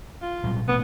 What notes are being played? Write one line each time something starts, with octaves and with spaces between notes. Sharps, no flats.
F4
A#2 F#3 G3
A1 B2 A3 B3